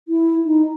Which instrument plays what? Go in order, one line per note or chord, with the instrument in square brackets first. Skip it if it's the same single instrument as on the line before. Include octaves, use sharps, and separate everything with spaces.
[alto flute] E4
D#4